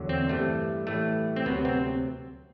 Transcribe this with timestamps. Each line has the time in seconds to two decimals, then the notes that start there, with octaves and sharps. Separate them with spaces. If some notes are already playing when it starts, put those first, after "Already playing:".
Already playing: E2 D3 F#3
0.09 C4
0.29 G2 E3 G3 A3
0.87 A2 E3 G3 A3
1.36 C4
1.45 D2 C3 F#3 B3
1.65 C4